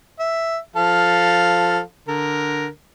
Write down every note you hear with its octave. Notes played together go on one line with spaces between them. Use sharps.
E5
F3 A4 F5
D3 A#4